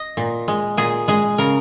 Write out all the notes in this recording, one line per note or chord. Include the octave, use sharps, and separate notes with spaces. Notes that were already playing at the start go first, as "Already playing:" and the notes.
Already playing: D#5
A#2
G#3
A#2 G#4
G#3 G#4
C#3 A#4